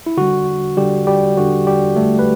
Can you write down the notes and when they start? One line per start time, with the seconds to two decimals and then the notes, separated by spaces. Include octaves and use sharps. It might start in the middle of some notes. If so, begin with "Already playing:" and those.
0.06 E4
0.17 D3 G3 F#4
0.77 D3 G3 G4
1.07 G3 G4
1.37 D3 G3 F#4
1.67 G3 G4
1.96 D3 G3 A3 A4
2.19 B4